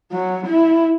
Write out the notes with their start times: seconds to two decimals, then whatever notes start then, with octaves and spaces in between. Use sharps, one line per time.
0.12 F#3
0.46 E4